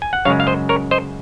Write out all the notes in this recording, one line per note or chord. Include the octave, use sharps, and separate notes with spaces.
G#5
F#5
F#2 C#3 G#3 C#5 F5
F5
C5 D#5
A#4 C#5
C5 D#5